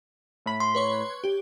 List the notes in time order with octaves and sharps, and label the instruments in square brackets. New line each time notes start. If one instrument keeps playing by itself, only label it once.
[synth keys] A2 B5
[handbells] C6
[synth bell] B4 C#5 C#6
G4